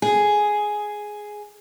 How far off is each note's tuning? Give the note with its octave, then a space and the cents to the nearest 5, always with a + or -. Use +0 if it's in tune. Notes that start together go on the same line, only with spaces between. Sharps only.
G#4 +5